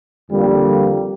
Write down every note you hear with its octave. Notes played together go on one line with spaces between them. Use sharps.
F2 D3 G3 A#3